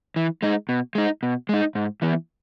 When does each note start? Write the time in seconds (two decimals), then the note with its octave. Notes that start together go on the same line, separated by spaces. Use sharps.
0.16 E3
0.43 G#3 D#4
0.69 B2
0.95 G#3 D#4
1.23 B2
1.49 G#3 D#4
1.75 G#2
2.02 E3 B3